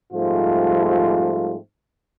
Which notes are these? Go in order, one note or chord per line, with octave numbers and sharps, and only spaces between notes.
G#2 F3 G3 A3 C4 F4